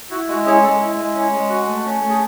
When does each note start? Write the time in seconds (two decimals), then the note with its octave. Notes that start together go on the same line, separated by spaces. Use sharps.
0.11 E4 F#4
0.28 G#3 F#4
0.46 C#4 G#4
0.63 G#3 A4
0.80 E4
0.97 G#3
1.14 C#4
1.32 G#3
1.49 F#4
1.67 A3
1.85 C#4
2.01 A3
2.09 G#4